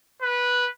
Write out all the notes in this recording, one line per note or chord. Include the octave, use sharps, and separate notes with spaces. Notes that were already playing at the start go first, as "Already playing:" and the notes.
B4